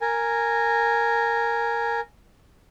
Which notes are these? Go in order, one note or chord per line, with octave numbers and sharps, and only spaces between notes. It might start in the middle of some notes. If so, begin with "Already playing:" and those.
A#4 G#5